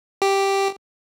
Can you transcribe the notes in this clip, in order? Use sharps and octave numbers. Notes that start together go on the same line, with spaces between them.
G4